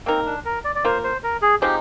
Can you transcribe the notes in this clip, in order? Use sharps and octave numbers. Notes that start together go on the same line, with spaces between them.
A#3 C4 D#4 A#4
D4
A#4
D5
D5
A#3 F4 A#4 C5
C5
A#4
G#4
F3 G#3 C4 D#4 G4